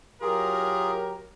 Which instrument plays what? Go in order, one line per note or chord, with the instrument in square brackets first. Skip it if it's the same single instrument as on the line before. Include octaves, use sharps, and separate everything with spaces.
[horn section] F#3 G4 A#4 [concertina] F4 G#4